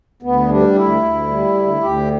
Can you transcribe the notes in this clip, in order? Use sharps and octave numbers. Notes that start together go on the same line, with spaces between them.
D2 B3
G3 D4
D2 E4
D2
G3
D2
D2 G4